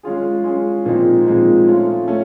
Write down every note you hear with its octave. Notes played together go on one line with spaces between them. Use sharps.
G#3 C#4 F4 G#4
G#3 C#4 F4 G#4
A#2 F3 G#3 C4 D#4
A#2 F3 G#3 C4 D#4
A3 C#4 F4
A3 C#4